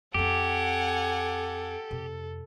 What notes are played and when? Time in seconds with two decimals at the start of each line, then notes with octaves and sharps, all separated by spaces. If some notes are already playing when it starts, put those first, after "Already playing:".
0.14 F2 C4 G4 A4 F#5 G#5
1.91 F2 C3